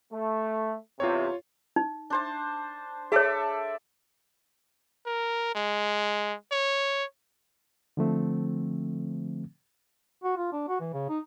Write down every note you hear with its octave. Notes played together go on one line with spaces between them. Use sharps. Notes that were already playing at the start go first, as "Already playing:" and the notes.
A3
E2 C3 F4 C#5
D#4
D4 C5 A5
G#4 A4 C#5 D5 E5
A#4
G#3
C#5
D3 F3 A3 C4
F#4
F4
D4
F#4
E3
C#3
D#4